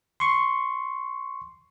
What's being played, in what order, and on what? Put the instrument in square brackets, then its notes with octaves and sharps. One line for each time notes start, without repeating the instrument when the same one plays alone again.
[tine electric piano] C6 C#6